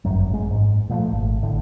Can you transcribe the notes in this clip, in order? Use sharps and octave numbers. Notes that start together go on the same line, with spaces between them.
G1 C2 F#2 F#3
A1 G#3
G#2
A#2 F3 G3 A3
G#1
A2 D3